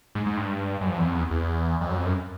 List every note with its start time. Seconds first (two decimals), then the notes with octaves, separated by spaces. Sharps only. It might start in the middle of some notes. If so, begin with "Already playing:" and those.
0.15 G#2
0.26 G#2
0.37 G2
0.81 F#2
0.90 F2
0.98 E2
1.06 F2
1.15 E2
1.31 E2
1.81 F2
1.89 F#2
1.97 F2
2.06 F#2